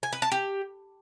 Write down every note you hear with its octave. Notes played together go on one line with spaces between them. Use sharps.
G#5
B4
A5
G4